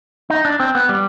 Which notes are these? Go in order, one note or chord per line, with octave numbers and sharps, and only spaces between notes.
D#4
D4
C4
B3
G3